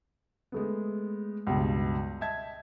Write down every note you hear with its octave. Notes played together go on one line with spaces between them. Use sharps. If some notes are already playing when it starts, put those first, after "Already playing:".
G#3 A3 B3
C#2 G2 B2
D#5 E5 A5 G#6